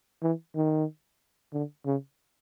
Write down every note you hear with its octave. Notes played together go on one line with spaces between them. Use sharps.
E3
D#3
D3
C#3